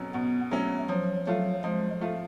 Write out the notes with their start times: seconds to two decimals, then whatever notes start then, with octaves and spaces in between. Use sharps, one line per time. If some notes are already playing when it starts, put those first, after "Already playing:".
Already playing: B2 F#3 C#4
0.14 B2 B3
0.51 F#3 A3 C#4
0.89 F3 F#3
1.27 F#3 A3 F4
1.64 F3 G#3
2.01 A3 F4